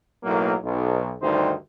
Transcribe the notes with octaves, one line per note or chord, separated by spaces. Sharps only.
B1 A2 F#3 A#3
B1
D2 G2 D#3 D#4 C5